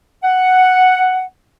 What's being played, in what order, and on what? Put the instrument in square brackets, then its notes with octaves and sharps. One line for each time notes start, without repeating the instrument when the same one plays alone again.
[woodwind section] F#5